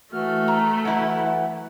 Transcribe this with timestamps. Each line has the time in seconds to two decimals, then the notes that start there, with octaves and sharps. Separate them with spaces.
0.13 E3 A3 F#4 F6
0.48 A#5
0.85 E3 F#3 E4 F#5